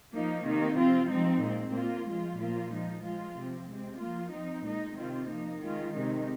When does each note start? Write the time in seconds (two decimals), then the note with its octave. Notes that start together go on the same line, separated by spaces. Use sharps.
0.13 F3 A#3 D#4
0.44 C3 D#3 A#3 D#4
0.77 F3 C4 F4
1.09 F3 G#3 C4 D#4
1.41 A#2 G#3 C4
1.73 A#2 A#3 F4
2.06 F3 G#3 F4
2.38 A#2 F3 A#3 F4
2.70 F3 G#3 D#4
3.03 F3 G#3 F4
3.35 C3 F3 C4
3.67 C3 G#3 C4
3.99 F3 A#3 F4
4.31 F3 C4 D#4
4.64 A#2 G#3 D#4
4.96 C3 D#3 C4 F4
5.28 F3 A#3 D#4
5.60 D#3 G#3 F4
5.93 C3 D#3 G#3 D#4